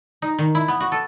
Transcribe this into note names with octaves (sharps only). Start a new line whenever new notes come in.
D#4
D#3
E4
B3
F#4
A4